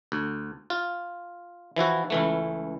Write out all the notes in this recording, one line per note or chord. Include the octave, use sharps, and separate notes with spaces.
D2
F4
E3 F3 E4 F#4
C#2 E3 A3